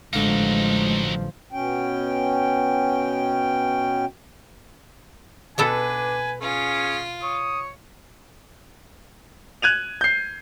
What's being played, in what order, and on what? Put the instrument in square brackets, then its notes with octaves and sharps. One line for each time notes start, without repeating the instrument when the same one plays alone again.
[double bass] A1 F3 [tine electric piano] D3 F5 [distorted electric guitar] F#3 D#4 [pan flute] G#3
[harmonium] B2 C#4 G5
[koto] B2 B3 A4 [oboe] D4 [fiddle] B4 [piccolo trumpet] G#5
[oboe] C#4 [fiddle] F4 [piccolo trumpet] G#4
[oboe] C#5 [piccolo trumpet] D#6
[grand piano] F#6 G#6 D#7 F7
G6 C7